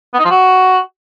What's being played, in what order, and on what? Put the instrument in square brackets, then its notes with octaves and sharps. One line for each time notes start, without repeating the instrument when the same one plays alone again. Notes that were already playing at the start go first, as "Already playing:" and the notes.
[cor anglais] B3
D#4
F3
F#4